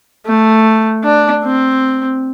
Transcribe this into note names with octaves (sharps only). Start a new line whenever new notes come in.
A3
D4
C4